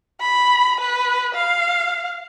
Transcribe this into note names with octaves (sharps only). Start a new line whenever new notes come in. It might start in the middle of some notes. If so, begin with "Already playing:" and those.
B5
B4
F5